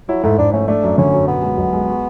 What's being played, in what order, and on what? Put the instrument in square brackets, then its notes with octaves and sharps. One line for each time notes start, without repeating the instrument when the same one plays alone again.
[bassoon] F#3 [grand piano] E4
[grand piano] G#2 [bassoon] A3
[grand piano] G#2 [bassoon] D4
[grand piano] A3 [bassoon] C#4
[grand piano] A3 [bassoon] D4
[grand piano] F#2
[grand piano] D3 [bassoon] C#4
[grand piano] F#2
[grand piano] B2 [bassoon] B3
[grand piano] G#3
B1
G#3
F#4